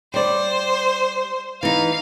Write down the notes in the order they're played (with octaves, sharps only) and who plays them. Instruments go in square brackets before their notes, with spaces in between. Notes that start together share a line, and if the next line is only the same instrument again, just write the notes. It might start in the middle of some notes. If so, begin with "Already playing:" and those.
[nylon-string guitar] G3 D5 [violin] C5
[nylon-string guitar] E3 D#4 [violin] F5